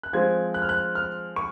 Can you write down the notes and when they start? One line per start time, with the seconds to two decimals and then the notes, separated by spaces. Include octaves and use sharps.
0.03 F#6
0.13 F3 G#3 C4 G#6
0.54 F#6
0.62 F6
0.69 F#6
0.95 F6
1.36 C#6